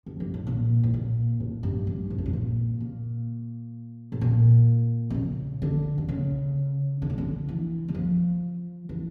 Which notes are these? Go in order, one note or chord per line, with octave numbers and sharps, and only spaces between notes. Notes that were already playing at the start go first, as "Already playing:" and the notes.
F2
G2
A2
A#2
A2
A#2
A2
G2
G2
A2
G2
A2
A#2
A#2
A2
A#2
D3
C#3
D3
D3
C#3
D3
C#3
D3
E3
G3
F3
E3